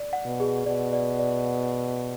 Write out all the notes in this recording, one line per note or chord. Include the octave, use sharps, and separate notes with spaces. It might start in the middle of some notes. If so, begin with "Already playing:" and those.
Already playing: D5
F#5
B2
G#4
B2 D5
D5
D5
F#5